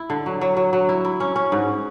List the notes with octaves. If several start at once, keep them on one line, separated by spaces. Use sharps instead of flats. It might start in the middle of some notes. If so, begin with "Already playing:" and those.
Already playing: E4
D3
F#3
F#3
F#3
F#3
E4
E4
C#4
C#4
G#2